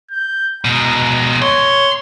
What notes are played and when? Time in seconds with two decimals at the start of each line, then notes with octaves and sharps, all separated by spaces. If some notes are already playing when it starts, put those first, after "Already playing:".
0.11 G6
0.65 B2 G#3 A#5
1.42 C#5 C6